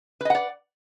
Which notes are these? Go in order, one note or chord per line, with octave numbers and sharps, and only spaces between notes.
B4 D5 D#5 F#5